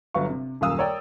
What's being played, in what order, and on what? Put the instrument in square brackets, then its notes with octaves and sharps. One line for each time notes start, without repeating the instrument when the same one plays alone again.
[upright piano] G1 F#3 B4 E5 F5 C#6
C3
D#1 F#2 A#3 F5 D#6 E6
A#4 C#5 D5 G5